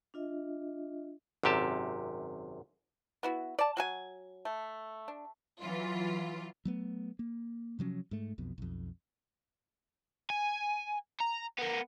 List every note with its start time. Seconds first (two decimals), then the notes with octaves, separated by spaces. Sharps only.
0.14 D4 F4 D#5 E5
1.43 G#1 F#2 C3 G4 A5
3.23 B3 E4 F#4
3.59 D5 A5
3.77 F#3 F#4 G#5
4.45 A3
5.08 D4
5.60 E3 F#3 F4
6.65 F#3 A3 B3
7.19 A#3
7.79 C3 F3 F#3 C#4
8.11 G#2 A3
8.38 B1 F2 B2
8.58 B1 F2
10.30 G#5
11.20 A#5
11.59 B3 A#4